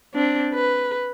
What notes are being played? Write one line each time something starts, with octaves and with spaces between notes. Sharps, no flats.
C4 D4
B4